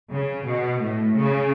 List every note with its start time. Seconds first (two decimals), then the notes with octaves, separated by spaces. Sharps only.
0.10 C#3
0.45 B2
0.81 A2
1.17 C#3